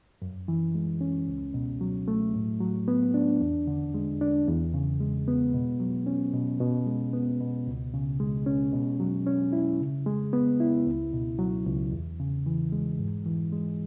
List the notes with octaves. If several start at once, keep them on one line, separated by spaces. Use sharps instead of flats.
F#2
E3
G#3
C#4
C#2
B2
F#3
A3
A2
F#3
B3
D4
E2
D3
G#3
D4
E2
C#3
G#3
B3
B2
F#3
C#4
B2
B2
G#3
B3
B2
C#2
C#3
G#3
C#4
B2
F#3
C#4
E4
C#3
G#3
B3
E4
C#2
B2
F#3
C#2
E2
C#3
E3
G#3
G#2
E3
G#3